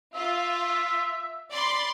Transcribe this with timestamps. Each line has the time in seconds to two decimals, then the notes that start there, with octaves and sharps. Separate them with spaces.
0.15 F4 E5
1.51 D5 B5 C6